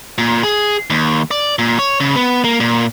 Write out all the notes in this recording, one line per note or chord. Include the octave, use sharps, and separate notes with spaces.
A#2
G#4
D#2
D5
A#2
C#5
C#3
B3
A#3
A#2